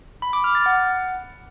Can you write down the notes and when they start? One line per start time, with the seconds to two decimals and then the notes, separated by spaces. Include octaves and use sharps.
0.22 B5
0.33 D6
0.44 F6
0.55 A6
0.66 F#5